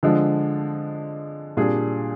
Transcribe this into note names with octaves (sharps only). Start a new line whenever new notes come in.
D3 F3 G#3 D4
A#2 G3 D4 G#4